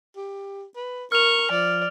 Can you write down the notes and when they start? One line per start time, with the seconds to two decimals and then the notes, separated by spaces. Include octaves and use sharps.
0.17 G4
0.76 B4
1.12 A#4 C#6 F6 F7
1.51 F3 D5